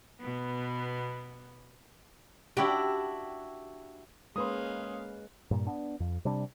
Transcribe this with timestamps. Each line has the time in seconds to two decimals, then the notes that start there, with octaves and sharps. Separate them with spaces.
0.20 B2 B3
2.57 D4 E4 F#4 G4
4.36 G#3 A#3 C#4 B4 F5 C6 D#6
5.51 G2 A#2
5.67 B3 D4
6.00 F2
6.25 C3 G3 D4